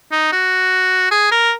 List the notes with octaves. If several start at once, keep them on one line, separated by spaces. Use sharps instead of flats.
D#4
F#4
G#4
A#4